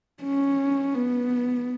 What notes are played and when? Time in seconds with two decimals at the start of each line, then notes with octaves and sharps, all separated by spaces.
0.23 C#4
0.95 B3